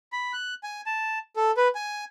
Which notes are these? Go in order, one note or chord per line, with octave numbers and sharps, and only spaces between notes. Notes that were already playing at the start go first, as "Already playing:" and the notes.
B5
F#6
G#5
A5
A4
B4
G#5